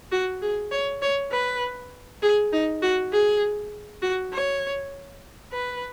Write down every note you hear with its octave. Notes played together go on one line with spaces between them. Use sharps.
F#4
G#4
C#5
C#5
B4
G#4
D#4
F#4
G#4
F#4
C#5
B4